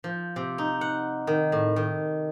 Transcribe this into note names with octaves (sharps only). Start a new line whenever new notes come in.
F3
C3
D#4
F#5
D#3
A2
D#3